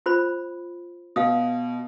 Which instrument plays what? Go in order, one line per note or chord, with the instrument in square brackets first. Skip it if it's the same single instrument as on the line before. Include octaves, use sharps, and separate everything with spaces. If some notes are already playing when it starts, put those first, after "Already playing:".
[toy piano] F4 C5 B5
[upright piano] B2 [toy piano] F5 D#6